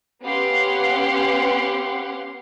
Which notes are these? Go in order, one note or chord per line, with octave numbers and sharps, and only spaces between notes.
B3 C#4 G4 F5 F#5 C6